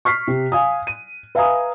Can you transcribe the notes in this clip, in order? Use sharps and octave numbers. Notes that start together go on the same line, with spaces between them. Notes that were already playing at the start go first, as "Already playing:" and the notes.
C#6 F6 B6 C7
C3
F5 G#5 D#6
D#7
B4 E5 F5 G#5 A#5 D#6